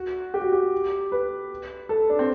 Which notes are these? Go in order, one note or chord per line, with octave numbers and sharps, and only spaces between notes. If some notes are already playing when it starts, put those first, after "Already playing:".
Already playing: F#4
G4
F#4
G4
B4
A4
D4
C4